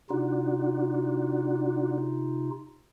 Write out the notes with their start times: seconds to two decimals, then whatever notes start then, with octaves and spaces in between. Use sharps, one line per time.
0.10 C3 D4 D#4 F4 F#4